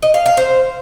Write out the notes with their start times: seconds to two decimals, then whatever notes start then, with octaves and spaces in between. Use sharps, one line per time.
0.02 D#5
0.14 F5
0.26 F5
0.37 C5